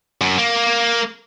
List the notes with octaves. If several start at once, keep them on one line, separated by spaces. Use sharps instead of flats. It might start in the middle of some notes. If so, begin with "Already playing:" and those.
F#2
A#3